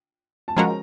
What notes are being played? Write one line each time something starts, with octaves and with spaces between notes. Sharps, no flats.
A5
F3 G#3 C#4 F#4 A#4 A#5